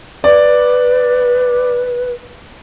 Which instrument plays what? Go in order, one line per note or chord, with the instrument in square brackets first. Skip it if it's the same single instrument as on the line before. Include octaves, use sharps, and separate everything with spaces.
[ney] B4 [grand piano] D5